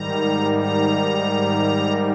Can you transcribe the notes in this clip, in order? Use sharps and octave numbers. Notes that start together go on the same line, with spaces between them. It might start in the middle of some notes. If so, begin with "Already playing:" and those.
Already playing: G#2 D#3 G3 A#5
A#5